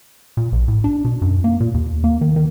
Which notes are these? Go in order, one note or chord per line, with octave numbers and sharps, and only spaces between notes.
A#2
A#1
A2
D4
B2
F#2
A#3
A#2
D#2
A#3
D#3
D#3